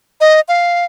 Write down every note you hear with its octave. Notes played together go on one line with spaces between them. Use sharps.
D#5
F5